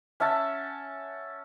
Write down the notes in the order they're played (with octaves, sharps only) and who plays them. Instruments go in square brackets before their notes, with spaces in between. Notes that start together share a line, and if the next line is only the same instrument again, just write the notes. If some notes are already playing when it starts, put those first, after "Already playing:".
[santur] C#4 E5 F#5 A5